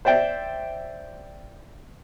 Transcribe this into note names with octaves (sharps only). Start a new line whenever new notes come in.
C5 D5 E5 G5